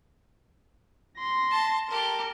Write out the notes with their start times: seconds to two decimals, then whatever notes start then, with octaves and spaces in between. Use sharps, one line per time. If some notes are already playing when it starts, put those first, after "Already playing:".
1.18 C6 A#6
1.51 A5
1.90 G4 A4 A#4